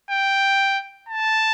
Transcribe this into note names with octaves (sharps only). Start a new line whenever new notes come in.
G5
A5